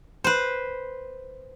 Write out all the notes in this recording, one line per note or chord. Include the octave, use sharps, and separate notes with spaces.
B4 C5